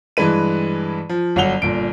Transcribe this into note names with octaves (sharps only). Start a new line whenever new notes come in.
G2 E3 G#3 B4 D#7
F3
G1 F#3 F#5 F7 G7
G1 A#2 D7